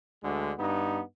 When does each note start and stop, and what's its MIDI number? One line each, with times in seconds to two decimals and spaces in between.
0.22 0.52 38
0.22 0.52 50
0.22 0.52 56
0.58 1.01 43
0.58 1.01 59
0.58 1.01 63